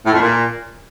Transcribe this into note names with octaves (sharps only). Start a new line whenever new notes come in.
A2
F2
A#2